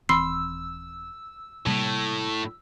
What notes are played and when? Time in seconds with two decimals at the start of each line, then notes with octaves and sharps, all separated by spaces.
0.09 D#1 E3 C4 B5 C6 E6 C7
1.67 A2 C3 G3 A#3